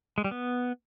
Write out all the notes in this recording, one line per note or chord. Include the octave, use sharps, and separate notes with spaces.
G#3
G3
B3